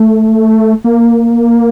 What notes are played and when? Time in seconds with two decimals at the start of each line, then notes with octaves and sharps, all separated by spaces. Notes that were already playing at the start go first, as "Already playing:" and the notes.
Already playing: A3
0.84 A#3